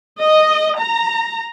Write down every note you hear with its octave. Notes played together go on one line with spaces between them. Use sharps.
D#5
A#5